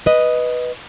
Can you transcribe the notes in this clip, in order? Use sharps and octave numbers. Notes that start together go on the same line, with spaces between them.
B4 D#5